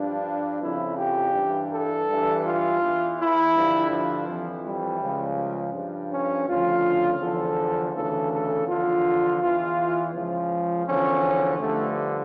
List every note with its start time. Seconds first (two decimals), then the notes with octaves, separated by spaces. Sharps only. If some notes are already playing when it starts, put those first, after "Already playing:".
Already playing: G2 F3 D4
0.61 F2 C#3 F3 E4
0.98 G4
1.34 G2 E3
1.70 A4
2.07 G2 E3
2.43 F4
2.81 E2 E3
3.18 E4
3.54 G2 D3 F3
3.91 F3
4.27 F2 E3
4.64 G3
5.00 C#2 C#3 F3
5.73 G2 F3
6.10 C#4
6.47 D2 C#3 F3 F4
7.19 E2 D3 F3 A4
7.93 D2 C#3 E3 A4
8.30 A4
8.66 E2 D3 F3 F4
9.40 E2 E3 F4
10.12 C#2 C#3 F3
10.85 E2 D3 F3 C#4
11.59 G2 D3 F3 A3